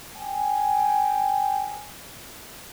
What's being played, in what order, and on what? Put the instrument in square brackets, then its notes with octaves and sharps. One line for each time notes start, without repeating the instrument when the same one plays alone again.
[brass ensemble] G5 G#5